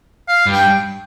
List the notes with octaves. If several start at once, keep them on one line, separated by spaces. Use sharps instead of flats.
F5
G2
G5